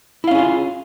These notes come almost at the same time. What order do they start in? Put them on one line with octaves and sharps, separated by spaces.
E4 F5 C#4 G#4 F4